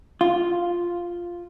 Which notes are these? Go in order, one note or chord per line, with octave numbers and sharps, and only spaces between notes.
F4